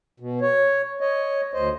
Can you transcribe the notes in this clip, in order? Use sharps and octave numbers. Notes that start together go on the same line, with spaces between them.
B2
C#5
C#5 D#5
D2 C5 D#5